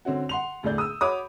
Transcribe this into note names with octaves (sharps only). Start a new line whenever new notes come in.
D3 C4 C#4 F#4
F#5 C6 F7
E1 D2 A2 G#4 D5 G6
D#6 E6
F#4 C#5 B5 D6 D#6